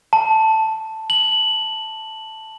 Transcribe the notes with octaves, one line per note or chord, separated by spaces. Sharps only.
A5
F#7